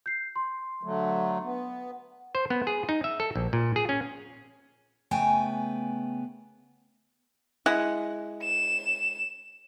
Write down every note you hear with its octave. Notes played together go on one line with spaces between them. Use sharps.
G6 C7
C6
D3 F#3 A3
B3
C5
B3
G#4
D#4
E5
A4
A#1
A#2
G#4
C#4
C#3 A3 B3 G5 G#5
G#3 E4 F#5
E7